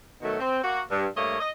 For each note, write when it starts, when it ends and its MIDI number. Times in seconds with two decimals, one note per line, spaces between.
0.22 0.38 47
0.22 0.38 51
0.22 0.38 54
0.22 0.38 57
0.38 0.62 60
0.63 0.80 58
0.63 0.80 66
0.89 1.06 43
1.16 1.37 43
1.16 1.37 57
1.16 1.37 58
1.16 1.37 73
1.16 1.37 75
1.39 1.50 75